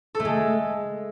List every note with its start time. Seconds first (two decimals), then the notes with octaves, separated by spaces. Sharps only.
0.15 A4
0.20 A3
0.25 G#3